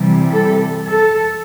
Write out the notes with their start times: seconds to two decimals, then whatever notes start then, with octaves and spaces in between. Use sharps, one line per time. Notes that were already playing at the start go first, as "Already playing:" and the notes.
Already playing: C3 E3 G3
0.32 A4
0.85 A4